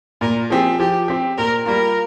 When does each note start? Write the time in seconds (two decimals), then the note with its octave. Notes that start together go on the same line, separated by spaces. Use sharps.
0.21 A#2 A#4
0.50 F3 C4 G4 G#4
0.79 F3 G4
1.08 C4 G4
1.38 A#2 A#4
1.66 G3 A#3 F4 A#4